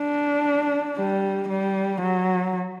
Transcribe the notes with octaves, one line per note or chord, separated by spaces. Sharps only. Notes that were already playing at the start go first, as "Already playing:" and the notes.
Already playing: D4
G3
G3
F#3